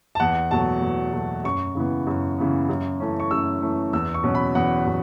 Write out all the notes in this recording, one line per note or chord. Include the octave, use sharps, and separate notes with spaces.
A5
E2 F#5
B2 F#3 A3 A5
E2
B2 F#3 A3
F#2 C#6
C#3 E3 B3
F#2
C#3 E3 B3
F#2
E3 A3 C#4
C#6
F#2 E6
E3 A3 C#4
E2 E6
C#6
B2 F#3 C#4
B5
E2 F#5
B2 F#3